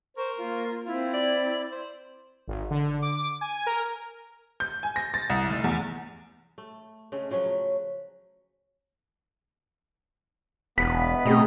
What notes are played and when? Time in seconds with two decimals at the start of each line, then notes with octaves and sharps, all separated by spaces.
0.17 A#4 C5 C#6
0.38 A#3 F4
0.86 C4 E4 F4
1.13 D5
1.72 C5
2.47 G#1
2.71 D3
3.02 D6
3.41 G#5
3.66 A#4
4.60 G6
4.83 G#5
4.96 A#6
5.14 A6
5.30 C2
5.49 F1
5.64 E2
6.58 A3
7.12 C#3 G#3 A3
7.31 F3 F#3 C#4 B4
10.78 E1 B3 B4 B6
11.25 B2 A3 C4 G#4 D#5 A#5